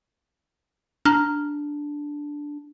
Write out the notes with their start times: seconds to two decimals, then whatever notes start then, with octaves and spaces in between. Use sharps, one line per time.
1.06 D4 A#5 F6